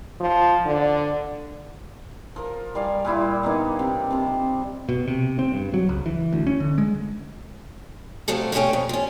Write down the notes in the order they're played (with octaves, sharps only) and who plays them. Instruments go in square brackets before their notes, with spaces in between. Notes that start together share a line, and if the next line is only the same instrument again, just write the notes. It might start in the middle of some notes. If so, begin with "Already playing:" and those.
[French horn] F3
D3
[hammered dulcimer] F3 A#4
G3 D5 F5 G#5
A#2 G3 E4 F4
A#3 B3 D4 D#4
C3
C3 C5 A5
[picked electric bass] B2
C3
C4
G2
F#3
C#2
E3
D2
C#4
D3
G#3
[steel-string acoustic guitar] F3 F#3 A3 C4
F2 B2 G3 A3 C#4 G5
F2
F3 C#4